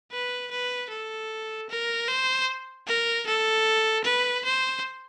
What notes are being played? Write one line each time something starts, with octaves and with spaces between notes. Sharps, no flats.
B4
B4
A4
A#4
C5
A#4
A4
B4
C5